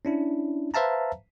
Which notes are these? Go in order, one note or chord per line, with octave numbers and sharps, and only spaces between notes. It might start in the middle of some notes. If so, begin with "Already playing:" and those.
C#4 D4 E4
B4 C5 E5 F5 A5 A#5